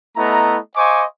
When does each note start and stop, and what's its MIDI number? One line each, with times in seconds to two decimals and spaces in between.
0.16 0.57 57
0.16 0.57 59
0.16 0.57 64
0.16 0.57 75
0.16 0.57 82
0.76 1.04 72
0.76 1.04 75
0.76 1.04 77
0.76 1.04 80
0.76 1.04 85
0.76 1.04 86